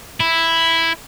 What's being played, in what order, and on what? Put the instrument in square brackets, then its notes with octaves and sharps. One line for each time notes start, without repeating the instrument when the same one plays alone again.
[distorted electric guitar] E4